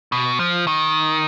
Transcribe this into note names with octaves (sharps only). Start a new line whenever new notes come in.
B2
F3
D#3